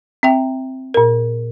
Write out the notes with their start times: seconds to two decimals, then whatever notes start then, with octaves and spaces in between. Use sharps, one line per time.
0.23 C4 E5 G5
0.94 A#2 A#4